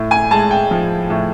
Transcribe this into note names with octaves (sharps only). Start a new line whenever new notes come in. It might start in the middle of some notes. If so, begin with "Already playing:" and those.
Already playing: A2
G#5
G#3 A5
G5
F3
A2